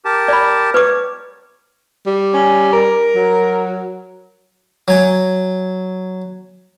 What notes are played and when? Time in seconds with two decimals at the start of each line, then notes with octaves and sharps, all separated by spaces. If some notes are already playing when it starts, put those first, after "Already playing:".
0.05 G4 A#4 A5
0.28 D5 B5
0.74 B4 C#5 D6
2.07 G3
2.34 C#4
2.73 A#4
3.16 F#3
4.88 F#3 G#5